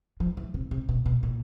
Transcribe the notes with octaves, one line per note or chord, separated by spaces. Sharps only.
F3
E3
C3
C3
B2
B2
A#2